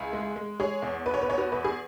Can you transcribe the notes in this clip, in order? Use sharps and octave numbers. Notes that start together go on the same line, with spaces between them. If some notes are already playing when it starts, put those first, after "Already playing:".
Already playing: C#2 E4 G#4
G#3
G#3
G#3 G#4 C#5
E2
E2 B4
C#5
B4
E2 C#5
F#4 B4
E2 B4
G#4